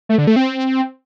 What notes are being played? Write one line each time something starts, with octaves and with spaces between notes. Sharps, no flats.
A3
D3
A3
C4